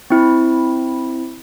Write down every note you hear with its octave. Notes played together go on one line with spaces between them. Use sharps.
C4 E4